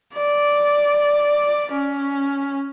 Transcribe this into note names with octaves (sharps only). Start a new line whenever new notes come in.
D5
C#4